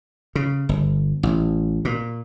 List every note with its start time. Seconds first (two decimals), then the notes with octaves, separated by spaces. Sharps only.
0.35 C#3
0.69 G1
1.23 A1
1.85 A#2